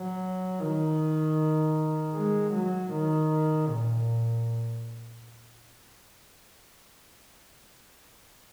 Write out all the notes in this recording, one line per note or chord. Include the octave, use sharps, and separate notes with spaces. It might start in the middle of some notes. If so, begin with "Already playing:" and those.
Already playing: F#3
D#3
G#3
F#3
D#3
A#2